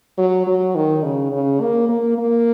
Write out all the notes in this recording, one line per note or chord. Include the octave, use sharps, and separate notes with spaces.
F#3
F#3
D#3
C#3
C#3
A#3
A#3
A#3